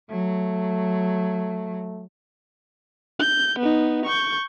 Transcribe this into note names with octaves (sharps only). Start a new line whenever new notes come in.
F#3 A3
G6
B3 D#4
C#6 G6